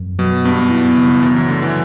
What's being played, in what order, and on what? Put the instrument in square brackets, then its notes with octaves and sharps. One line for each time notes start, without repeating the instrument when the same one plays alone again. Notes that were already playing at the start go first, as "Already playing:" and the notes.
Already playing: [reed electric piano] F#2
[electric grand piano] B2 [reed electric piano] F#3
[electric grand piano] G2 [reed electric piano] B3
[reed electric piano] E4
C#3
[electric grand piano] F#2 [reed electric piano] E3
[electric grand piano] F#2
[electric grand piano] D3 [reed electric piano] A3
[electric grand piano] E3